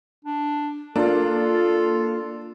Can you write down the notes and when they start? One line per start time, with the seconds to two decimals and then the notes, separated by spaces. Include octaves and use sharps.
0.25 D4
0.96 A#3 D4 F4 A4